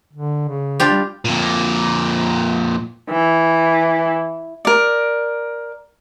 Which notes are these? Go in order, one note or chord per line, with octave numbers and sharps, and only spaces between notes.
D3
C#3
D4 F4 G4
G3
F2 A#2
E3
A#4 D5